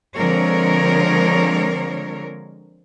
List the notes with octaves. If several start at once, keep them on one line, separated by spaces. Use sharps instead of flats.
D3 F3 G#3 C4 A#4 C#5